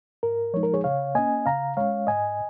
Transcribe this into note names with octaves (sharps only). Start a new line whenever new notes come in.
G#2 A#4
F3 G#3 D#4 C#5
A#4
G#4 C#5
C#3 C#5 F5
A#3 C#4 D#5 G#5
C#3 F5 A#5
G#3 C#4 C#5 F5
G#2 D#5 G#5